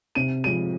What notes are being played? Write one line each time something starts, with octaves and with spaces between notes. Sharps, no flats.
C3 D#7
F3 G#3 C4 D#7